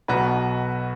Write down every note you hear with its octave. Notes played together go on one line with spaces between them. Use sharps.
B1 B2 F#3 B3 F#4 B4